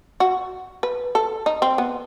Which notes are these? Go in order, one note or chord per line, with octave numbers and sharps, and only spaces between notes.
F#4
B4
A4
D#4
C4
B3